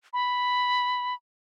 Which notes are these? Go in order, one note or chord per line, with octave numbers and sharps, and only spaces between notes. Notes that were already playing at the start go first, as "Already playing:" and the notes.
B5